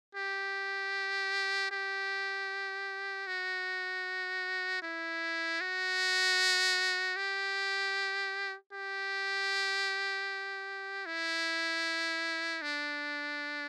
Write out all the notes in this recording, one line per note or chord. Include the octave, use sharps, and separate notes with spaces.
G4
G4
F#4
E4
F#4
G4
G4
E4
D4